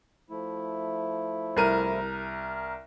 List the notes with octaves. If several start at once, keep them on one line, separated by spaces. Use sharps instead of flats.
F3 A3 E4
C2 A#4 D#7